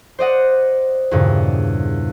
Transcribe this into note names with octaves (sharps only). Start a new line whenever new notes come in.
C5 D5 D#5 F#5
E2 G2 A#2 C#3